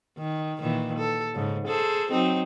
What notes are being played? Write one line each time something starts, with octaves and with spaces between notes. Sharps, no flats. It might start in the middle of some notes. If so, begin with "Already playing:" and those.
D#3
A#2 D#3 E3
A4
G#2 C#3
G#4 A4 C5
F#3 C4 D#4